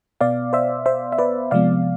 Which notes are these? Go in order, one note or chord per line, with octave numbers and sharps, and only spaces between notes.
B2 B3 D5 F5
C5 E5
C5 E5
E5
B4 D5
C3 F3 G#3 B3 D5 F5